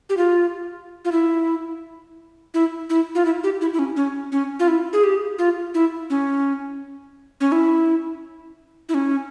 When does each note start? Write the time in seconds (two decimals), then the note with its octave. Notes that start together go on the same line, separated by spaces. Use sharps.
0.09 G4
0.17 F4
1.05 F4
1.12 E4
2.54 E4
2.90 E4
3.15 F4
3.25 E4
3.44 G4
3.61 E4
3.73 E4
3.79 C#4
3.96 C#4
4.32 C#4
4.60 F4
4.68 E4
4.93 G#4
5.04 G4
5.39 F4
5.74 E4
6.10 C#4
7.41 C#4
7.52 E4
8.89 E4
8.94 C#4